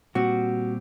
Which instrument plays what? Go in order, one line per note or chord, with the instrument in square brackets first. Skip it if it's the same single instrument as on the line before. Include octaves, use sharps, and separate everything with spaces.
[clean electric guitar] A#2 G3 C4 [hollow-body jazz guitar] F#4